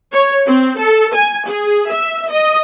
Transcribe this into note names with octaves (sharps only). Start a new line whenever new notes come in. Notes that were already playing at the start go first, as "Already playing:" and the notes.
C#5
C4
A4
G#5
G#4
E5
D#5